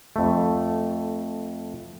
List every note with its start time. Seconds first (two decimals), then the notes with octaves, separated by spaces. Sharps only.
0.16 F2 A3